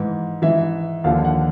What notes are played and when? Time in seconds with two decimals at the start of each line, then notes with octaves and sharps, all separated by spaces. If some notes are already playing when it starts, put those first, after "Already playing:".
Already playing: G#2 E3
0.42 G#2 E3 E5
1.04 D#2 D3 F3 F5
1.25 F#5